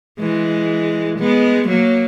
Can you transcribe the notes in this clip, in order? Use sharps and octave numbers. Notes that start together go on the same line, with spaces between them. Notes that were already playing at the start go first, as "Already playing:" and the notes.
E3 G#3
G#3 B3
F#3 A#3